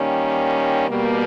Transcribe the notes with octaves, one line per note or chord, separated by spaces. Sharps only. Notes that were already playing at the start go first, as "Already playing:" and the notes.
Already playing: D#3 G3 A#3 C#4
B2 G3 A#3